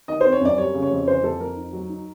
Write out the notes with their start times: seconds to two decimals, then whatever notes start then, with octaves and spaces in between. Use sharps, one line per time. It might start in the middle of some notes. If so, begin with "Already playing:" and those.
0.08 D#3 D#5
0.21 C4 C5
0.33 C#5
0.41 F#2 D5
0.58 G3 C#5
0.75 C#3
0.83 C#5
0.91 F2
1.07 E3 C5
1.23 F2 A4
1.40 F2 A#4
1.57 D#4
1.73 F#3
1.89 D#4